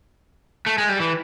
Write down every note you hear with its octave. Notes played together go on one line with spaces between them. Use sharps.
A3
G#3
G3
E3